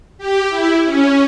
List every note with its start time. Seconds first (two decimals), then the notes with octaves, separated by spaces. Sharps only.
0.18 G4
0.50 E4
0.84 C#4